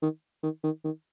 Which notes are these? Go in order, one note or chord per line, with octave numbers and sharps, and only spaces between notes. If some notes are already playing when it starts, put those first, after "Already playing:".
D#3
D#3
D#3
D#3